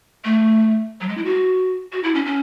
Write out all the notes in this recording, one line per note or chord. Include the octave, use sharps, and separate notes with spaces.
A3
F#3
G#3
E4
F#4
F#4
E4
C#4
C#4